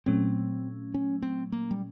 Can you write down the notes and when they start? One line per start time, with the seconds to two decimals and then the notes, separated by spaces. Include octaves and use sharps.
0.06 A#2 F#3 A3 C4 C#4
0.94 C#4
1.22 C4
1.52 A#3
1.71 G3